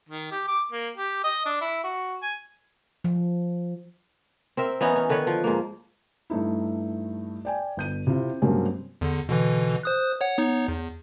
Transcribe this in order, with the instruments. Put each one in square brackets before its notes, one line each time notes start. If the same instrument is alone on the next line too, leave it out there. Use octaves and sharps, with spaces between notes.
[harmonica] D#3
G4
D6
A#3
G4
D#5
D4
E4
F#4
G#5
[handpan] F3
[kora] C4 A#4 E5
E3 B3 C#4 D#4
C#4
D3 D#3 B4 C#5
F3
G#2 A#3
[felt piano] G2 A3 D#4 E4
D5 G5 G#5
G1 G6 D#7
C3 E4 F4
G2 C3 F#3 G#3 A#3 C#4
[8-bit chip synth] E2 D3
B2 D3 E3
C5 D#6 F#6
C#5 F#5
B3 D#4 C#5
E2